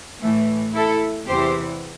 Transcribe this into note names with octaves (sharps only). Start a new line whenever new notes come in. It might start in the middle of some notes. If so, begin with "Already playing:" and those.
A2 E3 A3
E4 A4
E2 C3 E3 G4 C5